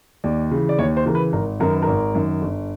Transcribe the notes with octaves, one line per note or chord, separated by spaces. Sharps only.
D#2 D5
C#3 E3
D5
D#2 C#5
C5
C#3 E3 A#4
B4
G#1 A#4
F#2 D#3 A#4
B4
G#1 A#4
F#2 D#3
G1